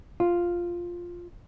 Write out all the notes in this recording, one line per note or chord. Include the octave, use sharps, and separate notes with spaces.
F4